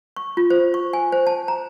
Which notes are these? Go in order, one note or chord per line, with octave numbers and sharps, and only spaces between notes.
C#6
F4
C5
C#6
G#5
C5
A5
A#5